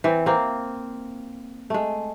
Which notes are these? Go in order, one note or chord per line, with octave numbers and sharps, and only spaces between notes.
E3 C4
A#3 C4
G#3 A3